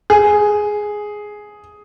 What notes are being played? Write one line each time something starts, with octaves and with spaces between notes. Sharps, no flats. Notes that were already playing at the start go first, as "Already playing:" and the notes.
G#4